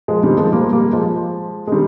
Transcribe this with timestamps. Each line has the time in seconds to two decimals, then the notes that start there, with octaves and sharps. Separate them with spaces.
0.08 F3 G#3
0.23 D#3 G3
0.38 F3 G#3
0.53 G3 A#3
0.73 G3 A#3
0.93 F3 G#3
1.67 G#3
1.72 D#3 G3